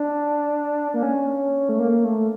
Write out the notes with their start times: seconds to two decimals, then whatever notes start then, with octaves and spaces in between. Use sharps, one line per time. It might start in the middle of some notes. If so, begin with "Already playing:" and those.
Already playing: D4
0.94 A#3
1.03 C#4
1.69 A3
1.79 A#3
2.04 A3